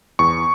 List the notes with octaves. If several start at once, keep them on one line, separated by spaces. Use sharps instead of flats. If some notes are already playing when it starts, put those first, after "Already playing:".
E2 C#6